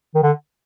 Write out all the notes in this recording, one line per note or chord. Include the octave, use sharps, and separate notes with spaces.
D#3
D3